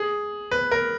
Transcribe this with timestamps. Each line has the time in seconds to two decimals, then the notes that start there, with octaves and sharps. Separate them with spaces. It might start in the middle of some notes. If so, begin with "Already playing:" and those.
Already playing: G#4
0.51 B4
0.71 A#4